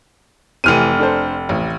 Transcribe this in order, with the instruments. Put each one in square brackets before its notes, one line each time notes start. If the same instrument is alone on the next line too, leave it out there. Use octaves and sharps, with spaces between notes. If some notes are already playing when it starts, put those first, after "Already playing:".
[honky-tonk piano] F1 F6 D#7 [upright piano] C3 E3
[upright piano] D4 A4 C5
A1